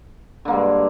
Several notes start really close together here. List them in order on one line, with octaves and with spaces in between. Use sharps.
D3 A#3 G#3 G2